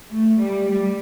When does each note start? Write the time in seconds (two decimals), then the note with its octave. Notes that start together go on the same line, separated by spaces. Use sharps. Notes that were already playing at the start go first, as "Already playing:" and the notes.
0.10 A3
0.40 G3
0.71 G3